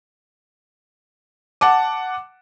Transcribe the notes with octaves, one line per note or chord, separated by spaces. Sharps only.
F#5 A5 D6